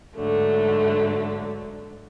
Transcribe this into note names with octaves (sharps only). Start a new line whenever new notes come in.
G#2 D3 F#3 A3